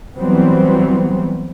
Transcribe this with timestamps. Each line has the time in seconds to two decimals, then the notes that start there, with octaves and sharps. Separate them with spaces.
0.17 E3 F#3 G3 B3 C4